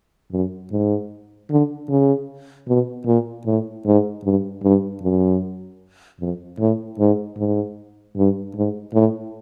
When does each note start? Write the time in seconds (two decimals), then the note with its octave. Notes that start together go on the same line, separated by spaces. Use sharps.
0.32 F#2
0.72 G#2
1.50 D3
1.89 C#3
2.68 B2
3.06 A#2
3.46 A2
3.85 G#2
4.24 G2
4.63 G2
5.02 F#2
6.20 F2
6.59 A2
6.99 G#2
7.37 G#2
8.16 G2
8.55 G#2
8.94 A2